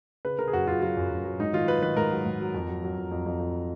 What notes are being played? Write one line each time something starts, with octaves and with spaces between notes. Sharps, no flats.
C#3 B4
C#3 A#4
G#4
F#2 F#4
F#2 F4
F#3 F4
F#2
F#2
F#3
G#2 D#4
D#3 F4
F#3 B4
D#3 B4
G#2 A#4
F#3
G#2
F#3
F2
F#3
F#3
F2
F2
F2
F2